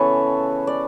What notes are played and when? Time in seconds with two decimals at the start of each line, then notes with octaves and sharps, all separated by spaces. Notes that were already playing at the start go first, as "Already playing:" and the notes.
Already playing: C#3 E3 B3 A4 B4 C#5
0.67 D5